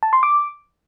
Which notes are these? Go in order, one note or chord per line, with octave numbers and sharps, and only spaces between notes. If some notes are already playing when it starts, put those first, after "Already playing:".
A5
C6
D6